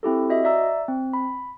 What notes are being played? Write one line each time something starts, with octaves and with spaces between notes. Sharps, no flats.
C4 E4 G4 A4
F#4 D#5 E5
D5 E5 A#5 E6
C4
B5